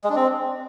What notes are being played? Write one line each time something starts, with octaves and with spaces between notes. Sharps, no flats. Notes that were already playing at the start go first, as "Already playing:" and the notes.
G#3
D4
C4